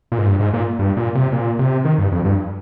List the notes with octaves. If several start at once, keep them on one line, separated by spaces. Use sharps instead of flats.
A#2
G#2
G2
G#2
A#2
G2
A#2
C3
A#2
C3
D#3
G2
F2
G2